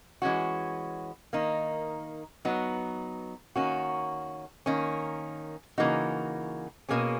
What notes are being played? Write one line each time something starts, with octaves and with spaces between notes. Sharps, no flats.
E3 G#3 C#4 F#4
D#3 A#3 D#4
F#3 B3 D#4
D#3 A#3 C#4 F#4
D#3 A#3 C#4
C#3 E3 A#3 D#4 F#4
B2 A#3 C#4 G#4